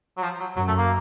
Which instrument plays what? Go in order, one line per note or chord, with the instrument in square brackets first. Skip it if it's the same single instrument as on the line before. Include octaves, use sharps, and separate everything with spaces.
[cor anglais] F#3
F3
F#3
[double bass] F#2 [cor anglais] F#3
[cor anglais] A3
A#3